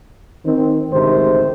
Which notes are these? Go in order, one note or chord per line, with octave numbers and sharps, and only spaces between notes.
D#3 C4
A1 D2 G#2 C3 D#3 C5